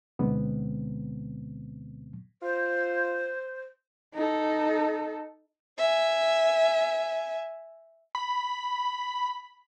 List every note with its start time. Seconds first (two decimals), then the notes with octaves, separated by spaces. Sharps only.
0.19 D2 B2 D3 G#3 B3 C4
2.42 F4 C5
4.14 D#4 A4
5.78 E5 G#5
8.15 B5